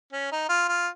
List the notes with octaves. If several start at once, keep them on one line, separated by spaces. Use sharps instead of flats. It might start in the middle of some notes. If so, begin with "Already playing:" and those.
C#4
D#4
F4
F4